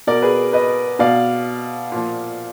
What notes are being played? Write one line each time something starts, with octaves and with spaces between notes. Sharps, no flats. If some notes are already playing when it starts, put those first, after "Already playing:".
B2 A#4 D5
G#4 B4
B4 D#5
B2 D5 F5
A#2 F3